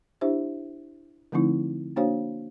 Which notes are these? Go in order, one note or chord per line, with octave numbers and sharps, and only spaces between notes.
D4 E4 G4 C5 E5
D3 F3 A3 C4 D#4 E4
A#3 D4 F#4 C5 C#5 F5